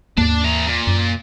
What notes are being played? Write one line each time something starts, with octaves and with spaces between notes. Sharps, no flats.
D#2 G#2 A#3 D4
E3 A#5
A#2
F#2